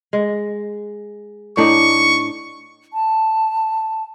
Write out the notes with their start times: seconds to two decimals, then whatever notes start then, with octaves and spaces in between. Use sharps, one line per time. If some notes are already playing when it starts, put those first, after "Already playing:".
0.13 G#3
1.57 A2 D4 D#4 C#6
2.93 A5